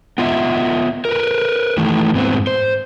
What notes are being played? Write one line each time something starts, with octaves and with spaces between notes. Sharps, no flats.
B3 F4 D#5 E5
A#4 B4
D#3 E3 A3
G#2 B3 C4
C5